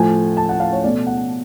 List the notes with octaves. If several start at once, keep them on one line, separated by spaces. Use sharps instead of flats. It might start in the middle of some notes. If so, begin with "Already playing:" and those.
Already playing: A2 F3 A3 G#5
A5
F#5
F5
C#5
B2 A3 D5
F#5